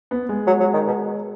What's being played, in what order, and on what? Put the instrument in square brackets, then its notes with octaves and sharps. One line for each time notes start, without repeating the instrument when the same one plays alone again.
[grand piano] B3
G#3
[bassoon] F#3
F#3
D#3
B2